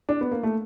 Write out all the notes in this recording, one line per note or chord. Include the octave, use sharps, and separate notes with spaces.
D4
B3
A#3
A3